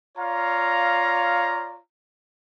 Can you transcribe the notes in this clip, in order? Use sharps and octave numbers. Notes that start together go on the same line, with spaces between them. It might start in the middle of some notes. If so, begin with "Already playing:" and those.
F4 C#5 D5 F5 A#5